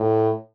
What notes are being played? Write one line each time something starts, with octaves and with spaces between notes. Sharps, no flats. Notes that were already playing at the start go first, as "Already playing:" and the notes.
Already playing: A2